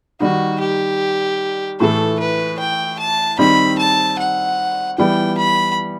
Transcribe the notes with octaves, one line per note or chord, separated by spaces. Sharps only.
D#3 G3 D#4 F#4
G4
A2 E3 A3 A4
B4
G5
A5
D#3 G3 C4 D#4 B5
A5
F#5
E3 G3 B3 G5
B5